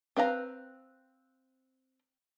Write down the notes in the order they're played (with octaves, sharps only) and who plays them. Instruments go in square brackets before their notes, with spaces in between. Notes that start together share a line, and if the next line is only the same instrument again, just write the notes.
[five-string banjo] C4 B4 F5 A#5